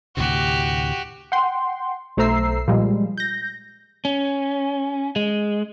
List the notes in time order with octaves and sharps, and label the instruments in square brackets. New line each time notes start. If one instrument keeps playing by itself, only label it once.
[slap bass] D2 A2 C3 [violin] F#4 G4
[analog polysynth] F#5 G5 C6
B1 A3 C5 A#5 E6 C7
A#2 F3 G3 G#3
G6 A#6
[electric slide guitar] C#4
G#3